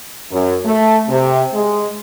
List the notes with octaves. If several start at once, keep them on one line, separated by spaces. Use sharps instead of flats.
F#2
A3
C3
G#3